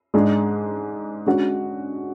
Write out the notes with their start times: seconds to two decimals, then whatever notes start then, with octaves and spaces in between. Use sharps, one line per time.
0.14 G#2 G#3 D4 G#4
1.26 D3 G#3 C#4 F#4